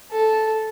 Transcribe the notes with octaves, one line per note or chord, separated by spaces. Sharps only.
A4